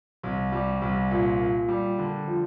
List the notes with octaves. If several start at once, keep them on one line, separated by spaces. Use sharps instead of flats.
C2
G3
C2
A#2
A#2
G3
D3
F3